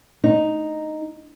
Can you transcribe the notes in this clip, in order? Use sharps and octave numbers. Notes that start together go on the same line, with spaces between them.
D#4